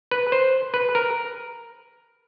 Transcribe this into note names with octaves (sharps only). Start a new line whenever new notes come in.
B4
C5
B4
A#4